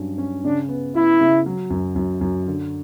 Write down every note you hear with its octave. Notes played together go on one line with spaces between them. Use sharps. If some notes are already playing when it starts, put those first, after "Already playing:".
Already playing: G2 F#3 C#4
C#4
C#3 D4
B3
B3 E4
C#3
F#3
F#2
F#2
F#2
D3